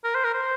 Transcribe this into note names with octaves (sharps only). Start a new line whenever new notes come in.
A#4
C5
A#4
C5